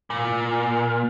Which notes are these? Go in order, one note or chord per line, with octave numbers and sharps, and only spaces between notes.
A#2